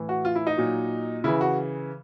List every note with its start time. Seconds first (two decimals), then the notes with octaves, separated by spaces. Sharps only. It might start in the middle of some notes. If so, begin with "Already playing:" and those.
Already playing: A2 E3
0.09 F#4
0.25 F4
0.36 E4
0.47 D#4
0.57 A#2 F#3
1.24 C#3 E3 E4
1.41 F#4